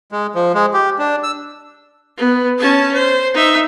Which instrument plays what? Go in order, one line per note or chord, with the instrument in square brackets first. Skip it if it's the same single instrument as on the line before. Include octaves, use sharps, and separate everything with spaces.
[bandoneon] G#3
F3
G#3
G4
D4
E6
[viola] B3
C#4 A5
C5
D#4 E5